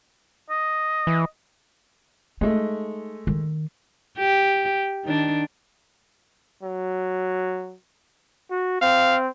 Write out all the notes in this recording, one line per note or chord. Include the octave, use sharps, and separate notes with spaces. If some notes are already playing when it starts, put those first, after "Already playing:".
D#5
E3
G#3 A3 D#4
D#3
G4
D#3 D4
F#3
F#4
C4 F5